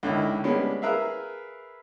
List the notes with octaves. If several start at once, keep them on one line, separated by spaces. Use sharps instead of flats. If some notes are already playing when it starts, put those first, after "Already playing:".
C#2 D3 D#3 E4
G3 G#3 A#3 B3 C#4 D4
G#4 A#4 B4 E5 F5